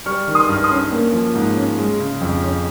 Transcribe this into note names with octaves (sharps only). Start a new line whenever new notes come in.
G3 C#6 F6
D#3
C6 D#6
G2 F6
C6 D#6
C#4
A#3
F3
G#2
C#4
G#3
C#3
F2
C#4